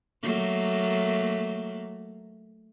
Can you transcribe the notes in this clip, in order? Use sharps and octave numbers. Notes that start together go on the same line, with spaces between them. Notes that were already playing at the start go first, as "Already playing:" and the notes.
F#3 A3 A#3